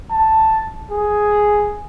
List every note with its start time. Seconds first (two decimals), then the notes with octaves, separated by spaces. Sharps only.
0.10 A5
0.91 G#4